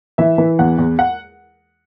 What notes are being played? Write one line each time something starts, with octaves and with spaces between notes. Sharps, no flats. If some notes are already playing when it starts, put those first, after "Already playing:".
E3 E5
E3
E2 F#5
E2
F#5